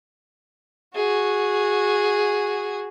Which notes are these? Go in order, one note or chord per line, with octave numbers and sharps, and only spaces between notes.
F#4 G#4